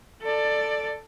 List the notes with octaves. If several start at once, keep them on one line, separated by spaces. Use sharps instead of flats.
A4 D5